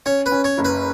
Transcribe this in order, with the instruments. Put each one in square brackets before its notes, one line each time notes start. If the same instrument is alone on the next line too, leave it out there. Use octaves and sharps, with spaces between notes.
[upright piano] C#4 [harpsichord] C#5
[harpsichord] B4
[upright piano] C#4
[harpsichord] C#5
[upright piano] F#1
[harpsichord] B4